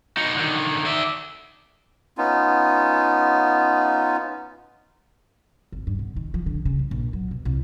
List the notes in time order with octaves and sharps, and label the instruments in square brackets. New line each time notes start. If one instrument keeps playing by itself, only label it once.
[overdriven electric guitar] D#4 F#4
D3 D#3
D5 E5
[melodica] B3 C#4 D#4 F4
[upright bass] G#1
G2
B2
D#3
F3
D3
C#3
B1
A#1
F#3
B2
C2